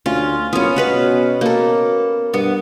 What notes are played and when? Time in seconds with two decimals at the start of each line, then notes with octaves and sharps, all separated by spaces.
0.06 D2 C#4 F4
0.53 F#1 B3 C#4 F4
0.76 B2 F#4 B4 F5
1.41 A#3 A4
2.34 G2 B3